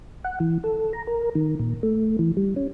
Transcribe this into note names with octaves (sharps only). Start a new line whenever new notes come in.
F#5
E3
A4
A#5
A#4
D#3
A#2
A3
E3
G3
C#4